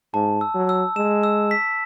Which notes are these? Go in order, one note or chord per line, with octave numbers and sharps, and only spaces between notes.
G#2 A5
E6
F#3
E6
G#3 E7
E6
B6